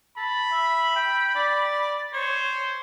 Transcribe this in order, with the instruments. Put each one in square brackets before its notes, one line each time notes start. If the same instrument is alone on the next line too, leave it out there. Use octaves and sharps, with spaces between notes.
[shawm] A5 [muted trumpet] B5
[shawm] E5
G5
D5
[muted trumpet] C5 [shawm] C#5